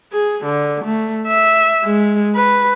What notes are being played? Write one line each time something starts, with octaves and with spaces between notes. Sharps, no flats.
G#4
D3
A3
E5
G#3
B4